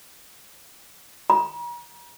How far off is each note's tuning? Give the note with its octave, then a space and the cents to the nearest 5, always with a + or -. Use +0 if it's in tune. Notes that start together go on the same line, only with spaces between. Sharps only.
A#5 +40